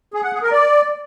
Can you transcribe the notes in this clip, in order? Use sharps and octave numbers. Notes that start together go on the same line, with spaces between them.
G#4
F#5
G#4
A#4
D5